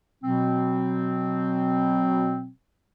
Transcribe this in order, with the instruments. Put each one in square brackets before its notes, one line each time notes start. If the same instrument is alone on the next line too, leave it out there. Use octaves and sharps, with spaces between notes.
[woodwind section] B2 F#3 C4